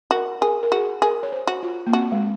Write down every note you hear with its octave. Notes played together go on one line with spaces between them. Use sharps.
F#4 A#4
G#4 A#4
A#4
F#4 G#4
G#4 A#4
C#5
C5
F#4
F4
A#3
C4 F#4
G#3